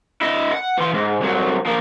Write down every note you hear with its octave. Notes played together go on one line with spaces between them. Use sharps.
E4 D#5
F#5
E3 C6
G#2
C2 F#3
F3 A#3